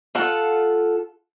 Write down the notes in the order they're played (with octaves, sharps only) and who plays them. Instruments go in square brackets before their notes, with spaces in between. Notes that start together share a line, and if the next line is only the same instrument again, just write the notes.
[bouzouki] F4 A4 F#5